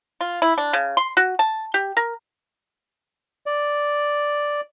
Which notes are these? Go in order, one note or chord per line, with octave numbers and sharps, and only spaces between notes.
F4
E4
D4
C#3
C6
F#4
A5
G4
A#4
D5